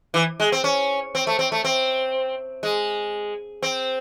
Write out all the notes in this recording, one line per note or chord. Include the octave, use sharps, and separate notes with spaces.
E3
G#3
C4
C#4
C4
A3
C4
A3
C4
G#3
C4